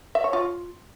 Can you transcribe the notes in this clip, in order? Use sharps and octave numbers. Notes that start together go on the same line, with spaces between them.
E5
C#5
F4